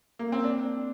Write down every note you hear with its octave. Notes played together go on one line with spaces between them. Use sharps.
A#3
C4
D4